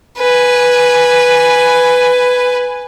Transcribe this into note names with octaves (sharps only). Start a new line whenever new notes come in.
B4 G#5